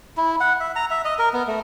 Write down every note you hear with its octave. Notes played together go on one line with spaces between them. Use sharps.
E4
F#5
E5
A#5
E5
D#5
A#4
B3
A3